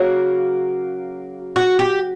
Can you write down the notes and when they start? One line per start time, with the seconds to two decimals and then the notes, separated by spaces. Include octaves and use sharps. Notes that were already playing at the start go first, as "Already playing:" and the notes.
Already playing: C#3 F#3 A#3 F#4
1.56 F#4
1.79 G4